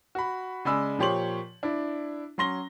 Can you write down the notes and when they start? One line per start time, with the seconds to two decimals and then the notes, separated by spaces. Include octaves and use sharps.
0.15 F#4 B5
0.65 C#3 G#3 D5 G#5 B5 E6
0.98 A#2 F3 G4 C#5 C6 F#7
1.63 D4 E4
2.38 F#3 C#4 C6 A#6 G7